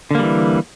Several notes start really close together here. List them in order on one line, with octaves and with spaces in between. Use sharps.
D3 A#3 G3 E3